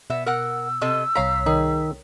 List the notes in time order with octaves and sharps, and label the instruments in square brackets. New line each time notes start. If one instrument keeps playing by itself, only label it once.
[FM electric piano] B2 [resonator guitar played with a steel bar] B3 E5
[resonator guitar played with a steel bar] A#4 F#5 [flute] E6
[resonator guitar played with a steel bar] C3 A4 D#5
[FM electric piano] C2 C#5 B6 [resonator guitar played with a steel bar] F5 A#5
[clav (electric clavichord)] D#3 D#4 [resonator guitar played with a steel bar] G#4